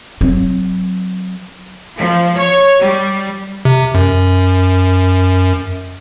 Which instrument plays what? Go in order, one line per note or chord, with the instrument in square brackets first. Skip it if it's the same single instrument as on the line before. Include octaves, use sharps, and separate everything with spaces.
[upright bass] F#3 C4
[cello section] F3
C#5
G3
[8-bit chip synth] C3
F#2